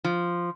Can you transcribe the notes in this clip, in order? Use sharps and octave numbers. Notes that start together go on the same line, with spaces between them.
F3